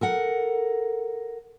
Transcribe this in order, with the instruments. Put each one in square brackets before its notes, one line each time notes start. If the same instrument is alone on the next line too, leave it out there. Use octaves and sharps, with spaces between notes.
[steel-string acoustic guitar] A4 A#4 F#5